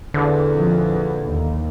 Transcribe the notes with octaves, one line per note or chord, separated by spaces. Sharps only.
E2 D3
A#1 F3 C4
D#2